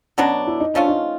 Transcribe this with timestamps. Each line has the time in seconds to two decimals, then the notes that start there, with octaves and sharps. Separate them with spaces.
0.18 B2 F#3 B3 C#4 D4
0.47 E4
0.60 D#4
0.74 F3 A3 C#4 D4 F4
0.88 D#4